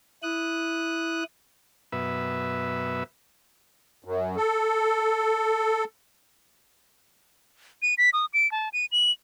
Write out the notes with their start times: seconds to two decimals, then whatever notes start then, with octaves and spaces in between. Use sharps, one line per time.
0.23 E4 D#6 F#6
1.92 F#2 B2 B4 E5
4.04 F#2
4.37 A4
7.82 D#7
7.98 B6
8.13 D#6
8.34 D7
8.52 A5
8.73 D#7
8.92 F#7